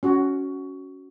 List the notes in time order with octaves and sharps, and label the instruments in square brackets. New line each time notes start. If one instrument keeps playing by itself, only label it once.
[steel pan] C#4 F#4